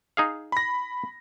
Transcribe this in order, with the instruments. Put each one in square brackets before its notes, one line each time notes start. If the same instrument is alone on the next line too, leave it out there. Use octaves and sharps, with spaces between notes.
[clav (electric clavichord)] D#4 G#4 F5
[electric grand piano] B5 A#6